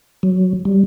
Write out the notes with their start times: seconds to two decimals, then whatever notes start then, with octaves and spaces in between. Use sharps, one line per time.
0.23 F#3
0.65 G3